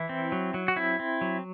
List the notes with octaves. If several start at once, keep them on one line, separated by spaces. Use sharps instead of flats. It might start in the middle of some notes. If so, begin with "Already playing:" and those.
Already playing: E3 E4
C4
F#3
F#3
F#4
C4 E4
C4
F#3